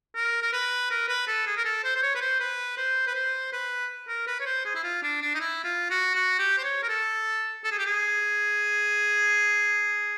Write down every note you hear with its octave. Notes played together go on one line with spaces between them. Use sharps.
A#4
A#4
B4
A#4
B4
A4
G#4
A#4
A4
C5
C5
C#5
B4
C5
B4
C5
B4
C5
B4
A#4
B4
C#5
C5
G#4
E4
F4
D4
D4
D#4
E4
F4
F#4
F#4
G4
C5
C#5
A#4
A4
A4
G#4
G4
G#4